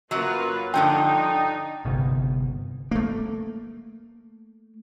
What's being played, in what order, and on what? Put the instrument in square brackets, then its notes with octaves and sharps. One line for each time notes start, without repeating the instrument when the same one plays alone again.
[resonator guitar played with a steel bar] F#2 F#3 [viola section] A#3 F4 B4
[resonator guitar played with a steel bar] G2 D3 F3 [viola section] D4 D#4 [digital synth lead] G5
[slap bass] G1 C3 B3
A3 A#3